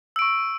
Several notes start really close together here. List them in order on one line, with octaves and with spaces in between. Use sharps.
E6 D7 C#6